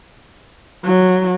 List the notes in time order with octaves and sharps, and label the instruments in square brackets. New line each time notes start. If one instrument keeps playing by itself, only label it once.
[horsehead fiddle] F#3